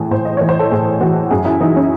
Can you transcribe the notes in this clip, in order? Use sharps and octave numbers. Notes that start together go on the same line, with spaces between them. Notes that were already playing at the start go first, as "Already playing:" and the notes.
Already playing: A2 E3 G#4
A2 C5
D#5
E3 C#5
C5
A4
A2 G#4
E3 F#4
F#2 G#4
E4
E3 D#4
C#4